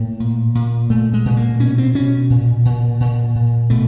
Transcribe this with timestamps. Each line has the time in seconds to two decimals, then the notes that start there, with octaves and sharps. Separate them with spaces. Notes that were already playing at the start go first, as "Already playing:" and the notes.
Already playing: A2 A#3
0.20 A#2
0.55 A#2
0.90 A#2 A3
1.13 G#3
1.25 A#2
1.37 A#3
1.60 B2 C#4
1.78 C4
1.95 B2 C#4
2.30 A#2
2.65 A#2
3.00 A#2
3.35 A#2
3.70 B2 A3